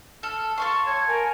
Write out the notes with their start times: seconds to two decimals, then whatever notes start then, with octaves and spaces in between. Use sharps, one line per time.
0.23 A4 F6
0.58 A4 F5 C6 C#6
0.87 C#5 G#6
1.08 A#4 G#5